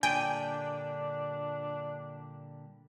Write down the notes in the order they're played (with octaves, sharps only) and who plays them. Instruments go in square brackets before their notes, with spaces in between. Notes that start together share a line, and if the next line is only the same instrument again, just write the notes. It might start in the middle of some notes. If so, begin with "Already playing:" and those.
[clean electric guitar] A#2 D3 G3 [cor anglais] D4 [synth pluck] G5 [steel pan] G#5